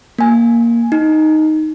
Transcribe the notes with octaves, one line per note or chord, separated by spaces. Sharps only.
A#3 G#5
D#4